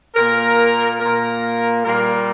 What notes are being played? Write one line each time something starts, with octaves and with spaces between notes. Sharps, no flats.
A#2 A#3 A#4
A#2 A#3 A#4
A#2 G3 A#3 A#4